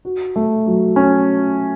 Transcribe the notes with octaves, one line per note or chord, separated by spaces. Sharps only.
F#4
A3
F#3
C#4